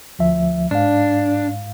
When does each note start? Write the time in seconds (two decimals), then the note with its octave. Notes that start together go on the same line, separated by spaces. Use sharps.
0.19 D2 F3 E5
0.71 G#2 D4 F5